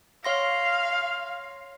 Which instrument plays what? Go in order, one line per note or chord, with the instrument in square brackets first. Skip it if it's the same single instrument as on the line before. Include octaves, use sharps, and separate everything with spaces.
[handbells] C#5 C6 A#6 [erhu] F5